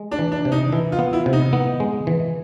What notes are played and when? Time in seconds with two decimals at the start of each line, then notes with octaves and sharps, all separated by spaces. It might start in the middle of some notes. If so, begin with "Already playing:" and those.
Already playing: G#3
0.12 D4
0.19 E3
0.32 D4
0.45 C3
0.52 D#4
0.72 E3 E4
0.92 F4
0.99 B3
1.13 E4
1.26 C3
1.33 D#4
1.53 B3
1.80 G#3
2.07 E3